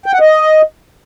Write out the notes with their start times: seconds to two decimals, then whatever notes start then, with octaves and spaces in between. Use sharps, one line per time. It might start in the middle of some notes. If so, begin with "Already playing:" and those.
0.06 G5
0.13 F#5
0.20 D#5